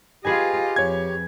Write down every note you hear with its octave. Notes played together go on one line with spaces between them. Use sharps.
F4 G4 G#4 B4 D#5 G#5
F2 C#5 G#6